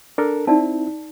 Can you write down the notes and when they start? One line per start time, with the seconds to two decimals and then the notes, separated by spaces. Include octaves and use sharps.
0.18 D4 A4 A#4
0.47 C4 D#4 E4 D5 A5